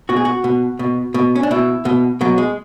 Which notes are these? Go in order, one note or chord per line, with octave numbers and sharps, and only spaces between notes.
B2 F#4
G#4
F#4
B2
B2
B2
C#4
D4
B2 E4
B2
B2 F#3
G#3